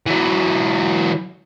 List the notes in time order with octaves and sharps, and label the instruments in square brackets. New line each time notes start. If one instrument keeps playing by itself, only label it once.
[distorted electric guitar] E3 F#3